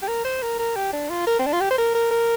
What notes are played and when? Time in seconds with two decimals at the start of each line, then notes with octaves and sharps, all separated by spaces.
0.02 G4
0.08 A#4
0.24 C5
0.42 A#4
0.59 A#4
0.76 G4
0.93 D4
1.10 F4
1.27 A#4
1.39 C4
1.46 D4
1.53 F4
1.61 G4
1.70 C5
1.78 A#4
1.95 A#4
2.11 A#4